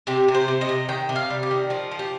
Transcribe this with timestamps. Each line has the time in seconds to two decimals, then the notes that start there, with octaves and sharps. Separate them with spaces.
0.07 C3 G4
0.28 C3
0.34 C5
0.48 C3
0.61 D#5
0.69 C3
0.89 D#3 G5
1.09 C3
1.16 F5
1.30 G3
1.43 G4
1.51 D#3
1.70 F3 F4
1.91 F3
1.99 G4